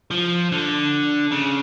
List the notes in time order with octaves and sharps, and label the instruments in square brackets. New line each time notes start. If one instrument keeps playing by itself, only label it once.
[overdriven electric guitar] F3
D3
C#3